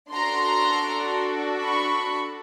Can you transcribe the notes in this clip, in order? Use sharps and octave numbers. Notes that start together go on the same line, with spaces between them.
D4 F#4 A4 A#5 C6
B5 C#6